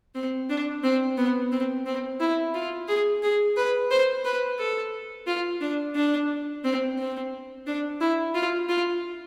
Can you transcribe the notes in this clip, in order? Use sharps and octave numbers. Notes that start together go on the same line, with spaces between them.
C4
D4
C4
B3
C4
C4
E4
F4
G#4
G#4
B4
C5
B4
A4
F4
D4
D4
C4
C4
D4
E4
F4
F4